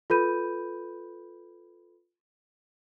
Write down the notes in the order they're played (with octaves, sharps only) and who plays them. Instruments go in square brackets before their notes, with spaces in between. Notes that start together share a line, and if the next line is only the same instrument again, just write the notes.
[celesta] F4 A4 B4 B5 G6 D#7